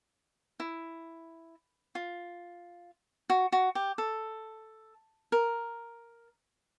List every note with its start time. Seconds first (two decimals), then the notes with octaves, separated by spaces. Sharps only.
0.60 E4
1.95 F4
3.30 F#4
3.52 F#4
3.75 G4
3.98 A4
5.32 A#4